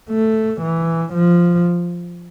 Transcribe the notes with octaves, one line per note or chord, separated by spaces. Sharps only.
A3
E3
F3